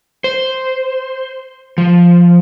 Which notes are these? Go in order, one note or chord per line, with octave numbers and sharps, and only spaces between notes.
C5
F3